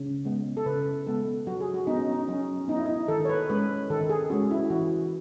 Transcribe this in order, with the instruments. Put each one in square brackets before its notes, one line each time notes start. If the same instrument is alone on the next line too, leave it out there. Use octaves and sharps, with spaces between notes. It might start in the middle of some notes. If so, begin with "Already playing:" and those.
Already playing: [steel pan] C#3
G#3 B3
A4
C#3 B4
G#3 B3 A4
F#3 F#4
G#4
F#4
B3 D#4
C#4
D#4
F#3 C#4
B3 D#4
E4
D#4
D#3 A4
C#5
B4
G#3 C#4 B4
D#3 A4
G#4
G#3 C#4 F#4
E4
E3 F#4